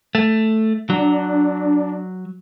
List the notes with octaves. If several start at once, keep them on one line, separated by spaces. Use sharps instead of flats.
A3
F#3 D4